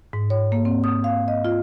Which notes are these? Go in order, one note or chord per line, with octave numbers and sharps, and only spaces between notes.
G#2
C#5
A#3
C4
D#6
F5
D#5
F4